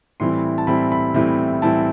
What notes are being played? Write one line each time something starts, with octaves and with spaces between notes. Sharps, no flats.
A2 E3 G3 C4 E4 C6
A5
A2 E3 G3 C4 E4 B5
B5
A2 E3 G3 C4 E4
A2 E3 G3 C4 E4 A5